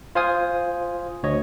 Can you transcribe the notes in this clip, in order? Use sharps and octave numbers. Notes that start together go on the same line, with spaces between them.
F4 C5 F5 G#5 D#6
D2 C#5 D#5